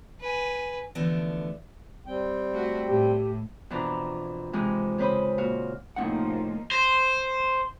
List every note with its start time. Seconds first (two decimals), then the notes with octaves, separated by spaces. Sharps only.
0.21 B4 G#5
0.95 D3 E3 F3 A3 B3 D4
2.07 G3 C4 G5
2.52 A3 F#4
2.88 A2 G4
3.70 F2 B2 E3 D4 B4 A#5
4.53 F2 C3 E3 G#3 D#4
4.98 C#3 C4 B4 C5 D#5 B5
5.38 A#2 F#4 F5
5.96 A2 C3 F3 A#3 D#4 F#5
6.71 C5